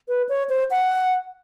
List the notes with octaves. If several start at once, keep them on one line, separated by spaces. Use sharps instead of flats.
B4
C#5
C5
F#5